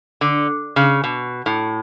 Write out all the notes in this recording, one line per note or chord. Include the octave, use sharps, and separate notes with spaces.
D3
C#3
B2
A2